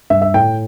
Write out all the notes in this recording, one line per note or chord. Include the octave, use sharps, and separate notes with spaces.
G2 E5
E5
A2 G5